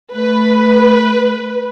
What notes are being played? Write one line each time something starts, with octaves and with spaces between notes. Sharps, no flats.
A3 B4